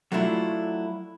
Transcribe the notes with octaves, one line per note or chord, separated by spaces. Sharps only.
F#3 A3 D4 E4 F4